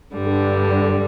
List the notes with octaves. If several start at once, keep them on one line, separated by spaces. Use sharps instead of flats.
G2 D3 G3